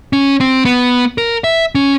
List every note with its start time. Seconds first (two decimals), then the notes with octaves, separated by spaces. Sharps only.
0.13 C#4
0.41 C4
0.65 B3
1.18 A#4
1.44 E5
1.75 C#4